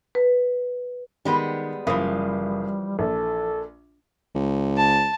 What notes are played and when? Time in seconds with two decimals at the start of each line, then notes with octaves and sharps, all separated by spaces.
0.15 B4
1.25 D#3 G3 G#3 B3
1.87 F#1 E3 F3 G3 F5 D#6
2.99 A#1 A4
4.35 C#2
4.77 A5